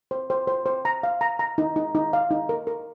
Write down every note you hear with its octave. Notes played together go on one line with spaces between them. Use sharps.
C5
C5
C5
C5
A#5
F5
A#5
A#5
D#4
D#4
D#4
F5
D#4
A#4
A#4